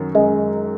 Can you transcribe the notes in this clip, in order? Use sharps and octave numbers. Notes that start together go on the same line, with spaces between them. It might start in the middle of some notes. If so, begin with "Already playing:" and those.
Already playing: F#2 D#3 F#3
F#2 G#3